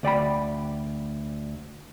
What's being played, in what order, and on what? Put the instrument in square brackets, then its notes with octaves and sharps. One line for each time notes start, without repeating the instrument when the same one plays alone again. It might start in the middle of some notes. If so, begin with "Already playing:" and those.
[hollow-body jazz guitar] D2 D5 G5 B5